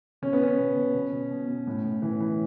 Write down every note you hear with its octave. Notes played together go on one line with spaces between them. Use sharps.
B2 C#4
B3
B2 C#4
B2
B2
B2
B2
B2
B2
A2
A2
E3
E3